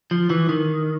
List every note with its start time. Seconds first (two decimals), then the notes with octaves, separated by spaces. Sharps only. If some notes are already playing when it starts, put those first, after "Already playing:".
0.11 F3
0.30 E3
0.49 D#3